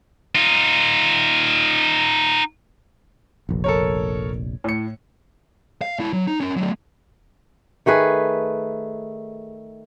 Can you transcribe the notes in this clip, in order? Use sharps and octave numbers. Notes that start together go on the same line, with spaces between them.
D#4 F4
F1 A#1
A4 A#4 C#5
A2 C#7
F5
G#3 E4
F#3
D#4
C#4 A#4
F#3 A3
D#3 A3 G#4 B4